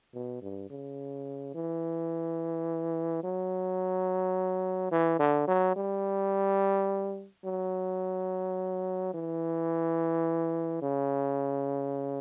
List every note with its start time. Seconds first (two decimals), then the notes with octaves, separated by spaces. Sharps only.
0.14 B2
0.42 G2
0.70 C#3
1.55 E3
3.24 F#3
4.92 E3
5.19 D3
5.48 F#3
5.76 G3
7.45 F#3
9.14 E3
10.82 C#3